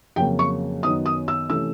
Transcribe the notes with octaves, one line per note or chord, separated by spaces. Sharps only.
F2 C#3 F#3 A#3 G5
C#6
F#2 D#3 F#3 B3 D#4 D#6
D#6
E6
C3 E3 A3 C#4 E6